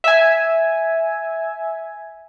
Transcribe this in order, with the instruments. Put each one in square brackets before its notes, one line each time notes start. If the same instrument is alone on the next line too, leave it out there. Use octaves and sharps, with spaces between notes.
[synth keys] E5 G#5